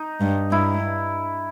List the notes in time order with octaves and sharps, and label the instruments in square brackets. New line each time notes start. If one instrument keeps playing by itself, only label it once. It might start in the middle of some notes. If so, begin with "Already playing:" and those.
Already playing: [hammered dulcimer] D#4
[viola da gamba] G2
[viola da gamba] G2 [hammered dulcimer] E4